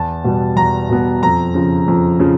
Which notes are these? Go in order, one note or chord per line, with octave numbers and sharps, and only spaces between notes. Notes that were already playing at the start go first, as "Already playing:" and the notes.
Already playing: E2 A5
B2 G3 B3
E2 A#5
B2 G3 B3
F2 A#5
C#3 F3
F2
C#3 F3